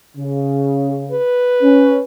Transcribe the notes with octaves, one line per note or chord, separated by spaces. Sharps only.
C#3
B4
C#4